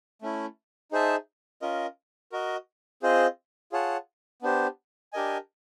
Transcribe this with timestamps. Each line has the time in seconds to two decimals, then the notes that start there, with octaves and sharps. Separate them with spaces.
0.22 A3 C#4 E4
0.92 D#4 G#4 C5 E5 A5
1.62 C#4 F4 A#4 D#5
2.32 F#4 A#4 D#5
3.02 C4 F4 G#4 C5 D#5
3.72 F4 G#4 C#5 F#5 A5
4.42 B3 D4 G4 C5
5.13 D4 G4 A#4 D#5 G#5